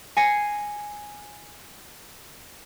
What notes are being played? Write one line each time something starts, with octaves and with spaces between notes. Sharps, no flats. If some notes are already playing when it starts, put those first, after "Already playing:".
G#5 A#6 C7 C#7